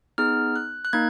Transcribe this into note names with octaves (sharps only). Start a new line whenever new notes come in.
B3 D#4 G#4 F6
F#6
F#6
A#3 D#4 G#6